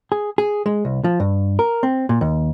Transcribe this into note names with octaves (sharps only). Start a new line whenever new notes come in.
G#4
G#4
G#3
C2
F3
G2
A#4
C4
A#2
D#2